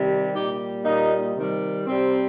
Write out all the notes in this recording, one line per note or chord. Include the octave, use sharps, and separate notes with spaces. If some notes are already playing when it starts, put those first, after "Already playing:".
Already playing: C3 D#3 G3
A#2 G3 D#4 G4
A#2 G3 A#3 D#4
C3 D#3 G3
C3 G3 C4